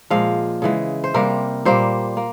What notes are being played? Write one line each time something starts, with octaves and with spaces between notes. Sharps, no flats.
A#2 F3 G#3 F5
C#3 E3 G#3
C5
C3 G3 A#3 A#4
A#2 G3 A#3 C5
A#3